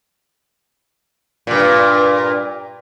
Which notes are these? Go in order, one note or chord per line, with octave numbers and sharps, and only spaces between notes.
G2 A#2